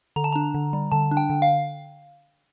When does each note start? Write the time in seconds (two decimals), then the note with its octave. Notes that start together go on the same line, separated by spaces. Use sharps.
0.16 D3 A#5
0.24 A5
0.33 D4 A#5
0.54 D3
0.73 G3
0.92 D3 A5
1.11 D4
1.17 G5
1.30 D3
1.42 F5